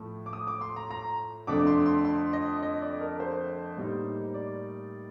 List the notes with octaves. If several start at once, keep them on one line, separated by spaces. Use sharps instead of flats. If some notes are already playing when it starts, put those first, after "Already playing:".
Already playing: A2 F3 A3
D6
D#6
D6
C6
A#5
A#5
F2 D3 A3 D4 D6
C6
C6
C6
D#5
D#5
D5
A#4
C5
A2 G3 A#3 D#4
D5